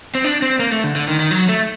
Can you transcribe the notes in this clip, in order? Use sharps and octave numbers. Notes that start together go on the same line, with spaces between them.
C4
D4
C4
A#3
A3
D3
D3
D#3
D#3
F#3
A3